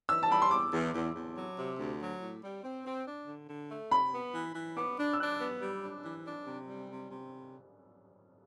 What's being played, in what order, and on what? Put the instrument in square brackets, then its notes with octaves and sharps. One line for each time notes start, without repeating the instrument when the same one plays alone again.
[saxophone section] E3 [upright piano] E6
[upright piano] A5
[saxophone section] G3 [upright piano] B5
[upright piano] C6
[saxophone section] E2 [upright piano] D6
[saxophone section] E2
E2
E2
F#3
C3
D2
F#3
A2
G3
C4
C4
D4
D3
D3
A3
[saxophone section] C3 [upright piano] B5
[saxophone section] B3
E3
E3
[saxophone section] B3 [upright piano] D6
[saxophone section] D4
[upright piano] E6
[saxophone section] D4 [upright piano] F#6
[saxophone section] B3
G3
D4
E3
D4
C3
G3
C3
C3